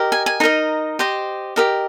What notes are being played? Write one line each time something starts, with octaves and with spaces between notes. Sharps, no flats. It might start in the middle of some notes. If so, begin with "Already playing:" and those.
Already playing: G4 A#4 D#5
G#5
G#5
D#4 A#4 D#5 A#5
G4 C5 D#5
G4 A#4 D#5